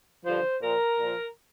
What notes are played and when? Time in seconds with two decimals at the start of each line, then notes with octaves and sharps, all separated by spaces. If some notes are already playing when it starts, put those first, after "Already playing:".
0.26 G2 D3 F3 C5
0.62 A#2 F3 A#4
0.99 A#2 F3